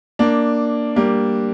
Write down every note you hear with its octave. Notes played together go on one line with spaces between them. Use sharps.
A#3 D4
G3 A#3